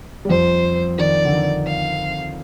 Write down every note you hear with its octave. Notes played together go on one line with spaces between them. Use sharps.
G3
F2 F3 C5
D#3 D5
D3
D#3
F5